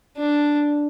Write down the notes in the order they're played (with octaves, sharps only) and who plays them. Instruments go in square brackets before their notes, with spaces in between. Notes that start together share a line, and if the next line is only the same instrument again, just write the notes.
[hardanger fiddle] D4